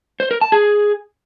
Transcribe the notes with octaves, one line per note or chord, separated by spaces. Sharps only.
C5
A#4
A5
G#4